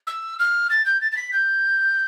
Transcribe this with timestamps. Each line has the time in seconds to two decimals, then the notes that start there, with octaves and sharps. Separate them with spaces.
0.07 E6
0.39 F6
0.70 A6
0.86 G6
1.01 A6
1.12 A6
1.17 B6
1.33 G6